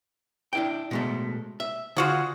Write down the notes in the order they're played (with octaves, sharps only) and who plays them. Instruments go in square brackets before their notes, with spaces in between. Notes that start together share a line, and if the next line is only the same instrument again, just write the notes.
[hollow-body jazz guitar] D4 E4 G5
B2 G#3 A3
E5
[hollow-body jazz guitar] D3 [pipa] F4 F#4 G#4